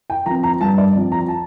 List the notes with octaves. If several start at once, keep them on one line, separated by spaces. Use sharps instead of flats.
G5
F3 C4 A#5
A#5
G2 A5
D5
F3 C4
A#5
A5